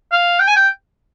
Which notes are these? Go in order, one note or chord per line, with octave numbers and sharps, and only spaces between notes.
F5
G5
G#5
G5